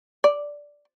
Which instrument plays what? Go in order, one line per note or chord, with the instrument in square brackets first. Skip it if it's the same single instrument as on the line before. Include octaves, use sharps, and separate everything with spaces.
[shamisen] D5